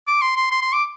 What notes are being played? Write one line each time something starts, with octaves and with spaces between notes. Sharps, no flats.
D6
C6
C6
C6
C6
D6